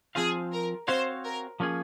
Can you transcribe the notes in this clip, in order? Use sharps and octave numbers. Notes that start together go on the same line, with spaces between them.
F3 C4 F4 G#4 C5 F5
A#4
C4 F#4 C5 C#5 F5
A#4
F3 A#3 C#4 G#4